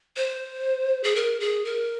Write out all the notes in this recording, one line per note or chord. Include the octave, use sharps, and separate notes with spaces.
C5
G#4
A#4
G#4
A#4